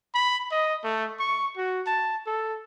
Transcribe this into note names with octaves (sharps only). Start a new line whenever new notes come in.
B5
D#5
A3
C#6
F#4
A5
A4